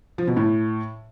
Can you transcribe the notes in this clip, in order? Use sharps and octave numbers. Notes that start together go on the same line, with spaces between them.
F3
B2
A2